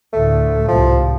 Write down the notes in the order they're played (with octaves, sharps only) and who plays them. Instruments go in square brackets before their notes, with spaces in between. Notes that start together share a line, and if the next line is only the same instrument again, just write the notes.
[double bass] D2 A2 [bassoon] A3
[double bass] C2 G#2 [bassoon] F3